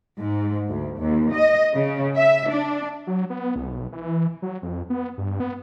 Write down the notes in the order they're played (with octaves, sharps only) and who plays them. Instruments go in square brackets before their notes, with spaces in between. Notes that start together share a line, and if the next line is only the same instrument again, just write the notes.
[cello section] G#2
D2
D#2
D#5
C#3
E5
D4
[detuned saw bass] F#3
B3
C2
B1
E3
F#3
F2
B3
G2
B3